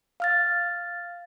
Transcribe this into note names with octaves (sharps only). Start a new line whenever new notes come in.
F5 F6 A6